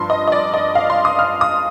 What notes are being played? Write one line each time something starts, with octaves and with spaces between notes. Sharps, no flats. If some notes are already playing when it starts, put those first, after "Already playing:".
Already playing: G2 F3 C6
D#5
D#5
D5
D#5
F5
C6
D#6
F6
D#6